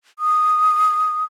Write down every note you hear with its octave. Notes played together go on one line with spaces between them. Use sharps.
D#6